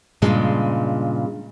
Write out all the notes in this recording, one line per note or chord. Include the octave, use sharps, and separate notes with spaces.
G2 A#2 C#3 G#3